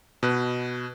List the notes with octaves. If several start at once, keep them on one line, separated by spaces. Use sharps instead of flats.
B2 B4 F#6